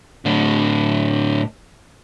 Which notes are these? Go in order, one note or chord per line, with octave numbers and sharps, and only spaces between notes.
A2 D3